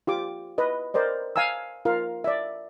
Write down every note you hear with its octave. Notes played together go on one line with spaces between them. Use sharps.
F4 G4 D6
B4 D#5
A#4 C5 D5 D#5
F5 G#5 A#5 E6
F4 A#4 F5
D5 E5